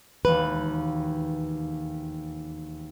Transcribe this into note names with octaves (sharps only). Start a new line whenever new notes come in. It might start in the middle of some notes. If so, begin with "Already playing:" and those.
E1 D#2 B4